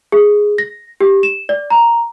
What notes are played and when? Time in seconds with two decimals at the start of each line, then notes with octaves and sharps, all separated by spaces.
0.12 G#4
0.58 A#6
1.00 G4
1.23 E7
1.49 D5
1.70 A#5